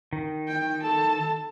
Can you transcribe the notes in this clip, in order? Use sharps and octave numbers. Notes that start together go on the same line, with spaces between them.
D#3
G5
A4 A5